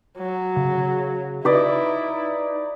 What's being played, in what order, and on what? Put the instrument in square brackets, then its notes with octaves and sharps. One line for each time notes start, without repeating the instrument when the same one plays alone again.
[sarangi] F#3
[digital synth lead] C#3
[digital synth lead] D#4 [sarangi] E4 [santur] B4 D5 D#5